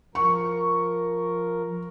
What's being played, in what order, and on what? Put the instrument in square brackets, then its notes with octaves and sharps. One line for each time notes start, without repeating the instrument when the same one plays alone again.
[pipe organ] F3 A#4 [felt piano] C#6